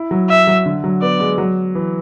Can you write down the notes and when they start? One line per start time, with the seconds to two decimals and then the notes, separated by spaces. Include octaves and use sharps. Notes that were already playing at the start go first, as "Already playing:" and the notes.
Already playing: E4
0.11 F#3
0.29 E5
0.47 F#3
0.66 D3
0.84 F#3
1.02 B3 D5
1.20 G#3
1.38 F#3
1.75 E3